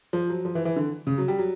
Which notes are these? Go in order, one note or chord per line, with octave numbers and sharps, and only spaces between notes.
F3
F#3
F3
E3
E3
D3
C#3
F#3
G3
F#3